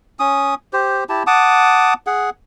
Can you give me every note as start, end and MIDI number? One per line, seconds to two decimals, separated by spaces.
0.19 0.55 61
0.19 0.55 87
0.73 1.04 67
0.73 1.04 72
1.09 1.23 64
1.09 1.23 67
1.09 1.23 81
1.27 1.94 78
1.27 1.94 81
1.27 1.94 86
1.27 1.94 87
2.07 2.30 68
2.07 2.30 78